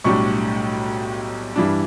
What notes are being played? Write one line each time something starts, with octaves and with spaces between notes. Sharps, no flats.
B1 A2 G3 D4 C#6
G2 E3 G3 D4